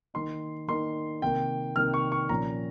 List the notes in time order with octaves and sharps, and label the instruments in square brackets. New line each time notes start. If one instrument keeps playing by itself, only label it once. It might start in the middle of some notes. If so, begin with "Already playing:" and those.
[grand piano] D#3 A#3 D#4 C6
D#3 A#3 D#4 C6
C3 D#3 A#3 G5
C3 D#3 A#3 F6
C#6
C#6
A#2 F3 A#3 C#4 A#5